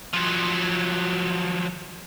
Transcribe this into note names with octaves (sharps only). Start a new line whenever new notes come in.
F3 F#3